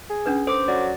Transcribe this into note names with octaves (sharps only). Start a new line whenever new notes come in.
G#4
C#4 D4 B4
A4 C5 D6
F#3 D5